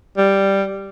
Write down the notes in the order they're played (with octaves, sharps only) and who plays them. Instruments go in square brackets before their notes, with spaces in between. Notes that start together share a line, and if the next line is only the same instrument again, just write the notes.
[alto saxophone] G3